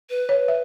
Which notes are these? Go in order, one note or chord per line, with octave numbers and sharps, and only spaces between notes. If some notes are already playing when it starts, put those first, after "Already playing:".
B4
C#5
E5